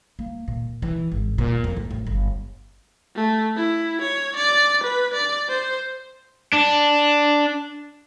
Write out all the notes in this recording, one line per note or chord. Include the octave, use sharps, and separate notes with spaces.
A#3
A#2
E3
G#1
A#2
F2
A1
A1
G1
A3
E4
C#5
D5
B4
D5
C5
D4